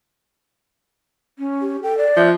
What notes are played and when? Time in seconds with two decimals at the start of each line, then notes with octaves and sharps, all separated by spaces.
1.39 C#4
1.61 G4
1.83 A4 G5
1.98 D5
2.16 F3 E5